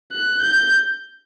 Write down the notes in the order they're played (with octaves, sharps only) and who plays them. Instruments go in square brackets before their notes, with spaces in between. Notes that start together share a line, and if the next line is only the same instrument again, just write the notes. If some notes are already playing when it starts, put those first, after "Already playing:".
[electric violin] F#6
G6